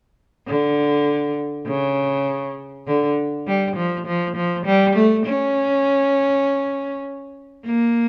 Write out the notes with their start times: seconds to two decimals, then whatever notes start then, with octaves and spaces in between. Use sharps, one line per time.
0.48 D3
1.67 C#3
2.87 D3
3.47 G3
3.77 F3
4.07 F3
4.36 F3
4.66 G3
4.96 A3
5.26 C#4
7.66 A#3